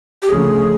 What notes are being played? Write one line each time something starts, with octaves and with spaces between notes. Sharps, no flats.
G4
D2 C#3 F3 A3 C#4 G#4